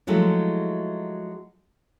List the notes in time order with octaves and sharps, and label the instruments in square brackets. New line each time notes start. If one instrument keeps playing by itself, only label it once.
[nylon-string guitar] F3 F#3 G#3 A3 E4